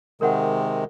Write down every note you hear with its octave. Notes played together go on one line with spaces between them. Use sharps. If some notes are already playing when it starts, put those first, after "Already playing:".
C3 D#3 G#3 A#4 C#5 F#5